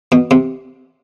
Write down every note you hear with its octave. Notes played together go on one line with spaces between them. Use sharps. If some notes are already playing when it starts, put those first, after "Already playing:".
B2
C3